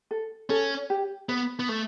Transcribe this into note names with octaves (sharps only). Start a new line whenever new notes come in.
A4
C#4 A4
G4
B3 B4
B3
A3